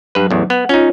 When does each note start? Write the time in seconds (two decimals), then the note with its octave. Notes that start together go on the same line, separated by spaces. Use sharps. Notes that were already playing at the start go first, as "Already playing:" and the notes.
0.15 G2 F#3 B4
0.31 A1 E2
0.50 B3 F#5
0.69 C#4 D#4 F4 C#5